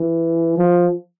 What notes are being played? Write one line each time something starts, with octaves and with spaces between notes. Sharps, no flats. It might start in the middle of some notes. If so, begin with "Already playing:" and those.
Already playing: E3
F3